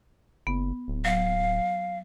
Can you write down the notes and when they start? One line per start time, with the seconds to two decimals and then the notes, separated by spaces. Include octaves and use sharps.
0.47 F#1 B3
0.88 D1
1.05 F#3 F5